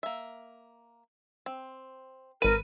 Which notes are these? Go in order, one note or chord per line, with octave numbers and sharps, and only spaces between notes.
A#3 E5
C4
G#1 A#4 B4 D#7